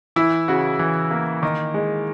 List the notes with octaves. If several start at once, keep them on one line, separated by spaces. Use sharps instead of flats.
E3 E4
C#3 F#4
E3
A#3
D#3
G#3